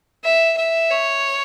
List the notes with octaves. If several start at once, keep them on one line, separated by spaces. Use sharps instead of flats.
E5
E5
C#5